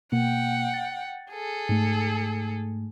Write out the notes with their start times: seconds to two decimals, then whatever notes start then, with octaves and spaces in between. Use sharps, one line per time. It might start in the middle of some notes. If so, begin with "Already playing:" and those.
0.12 B2 A#3 F#5 G5
0.74 A6
1.32 G#4 A4
1.69 G#2 A3